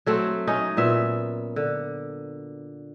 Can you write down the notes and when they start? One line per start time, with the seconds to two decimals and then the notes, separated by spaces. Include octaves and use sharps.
0.06 F#3 A3 C4
0.47 C#4 D#4
0.77 A#2 B3 E5
1.56 D3